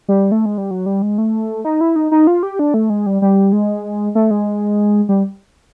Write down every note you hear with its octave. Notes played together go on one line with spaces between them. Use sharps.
G3
A3
G#3
G3
F#3
G3
G#3
A3
D#4
E4
D#4
D#4
F4
G4
D4
A3
G#3
G3
G3
G#3
A3
G#3
G3